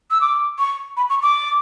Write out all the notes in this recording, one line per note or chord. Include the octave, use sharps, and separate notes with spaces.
E6
D6
C#6
B5
C#6
D6